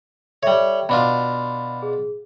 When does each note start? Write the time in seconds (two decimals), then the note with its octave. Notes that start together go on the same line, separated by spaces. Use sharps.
0.43 G3 A4 C#5 E5
0.89 B2 D4 F4 B5
1.82 G#4